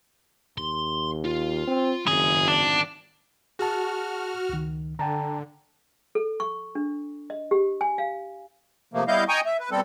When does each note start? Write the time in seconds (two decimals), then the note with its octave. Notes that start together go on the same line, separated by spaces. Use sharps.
0.58 D#2 C6
1.25 F4
1.67 C4
2.07 F#1 D#3 C4 G#4
2.48 D4
3.59 F#4 G#4 A5 F6
4.49 C#2 D#3
4.99 D3 G5 A5 A#5
6.15 A4
6.40 C#6
6.75 D4
7.30 D#5
7.51 G4
7.81 G#5
7.98 F5
8.94 C3 F3 A3 A#3
9.08 G3 B3 E4 D#5 F5 G6
9.29 D#5 G5 G#5 A#5 C#6 D#6
9.46 E5
9.60 B4
9.71 B2 G3 C4 A4